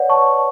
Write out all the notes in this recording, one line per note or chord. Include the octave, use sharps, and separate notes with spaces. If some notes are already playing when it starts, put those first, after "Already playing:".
Already playing: B4 C#5 D5 F#5
A5 C#6